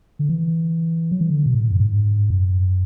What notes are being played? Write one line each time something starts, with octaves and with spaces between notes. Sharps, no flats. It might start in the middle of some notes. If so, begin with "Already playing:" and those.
D3
E3
F#3
E3
D3
B2
A2
F#2
G#2
F#2